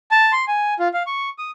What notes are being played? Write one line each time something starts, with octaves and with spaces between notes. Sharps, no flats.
A5
C6
G#5
F4
F5
C#6
D#6